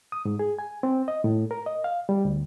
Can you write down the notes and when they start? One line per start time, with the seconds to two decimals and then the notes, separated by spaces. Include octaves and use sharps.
0.12 D#6
0.25 G#2
0.39 G#4
0.59 G#5
0.83 C4
1.08 D#5
1.24 A2
1.51 A#4
1.66 D#5
1.84 F5
2.09 G3
2.25 D2